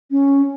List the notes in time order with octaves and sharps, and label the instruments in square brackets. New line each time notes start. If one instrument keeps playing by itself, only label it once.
[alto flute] C#4